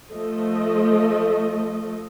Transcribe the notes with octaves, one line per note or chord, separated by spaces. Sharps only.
F3 A3 D#5